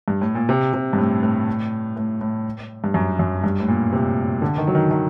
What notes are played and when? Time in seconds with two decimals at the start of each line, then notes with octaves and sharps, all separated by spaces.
0.08 G2
0.21 A2
0.35 A#2
0.49 C3
0.74 C3
0.93 G2
0.98 A2
1.23 A2
1.97 A2
2.21 A2
2.84 G2
2.94 F#2
3.19 F#2
3.44 G2
3.60 A2
3.68 A#2
3.93 C3
4.42 D3
4.58 D#3
4.67 F#3
4.75 D#3
4.91 D#3